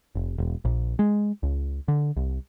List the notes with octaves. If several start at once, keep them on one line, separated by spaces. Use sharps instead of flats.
F1
E1
A#1
G#3
C#2
D3
C2